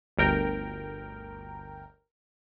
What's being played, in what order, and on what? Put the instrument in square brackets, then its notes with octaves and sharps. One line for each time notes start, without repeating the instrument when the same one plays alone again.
[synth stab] G1 D2 A#4 G5